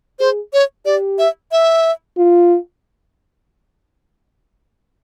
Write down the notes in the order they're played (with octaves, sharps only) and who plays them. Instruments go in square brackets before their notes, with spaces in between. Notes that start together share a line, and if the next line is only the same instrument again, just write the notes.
[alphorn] G#4 [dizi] C5
[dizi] C#5
[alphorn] G4 [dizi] D5
[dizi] E5
E5
[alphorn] F4